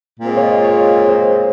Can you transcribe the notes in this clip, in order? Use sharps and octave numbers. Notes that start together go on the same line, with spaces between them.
A#2 G#3 C4 F4
C#5
D#5
C#5
C5